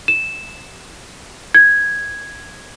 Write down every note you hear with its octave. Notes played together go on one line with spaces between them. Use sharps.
E7
G#6